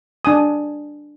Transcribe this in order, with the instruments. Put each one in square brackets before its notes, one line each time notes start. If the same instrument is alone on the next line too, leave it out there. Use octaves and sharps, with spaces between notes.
[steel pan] D4 G#5 D#6